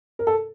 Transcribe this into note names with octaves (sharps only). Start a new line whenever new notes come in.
A#4
A4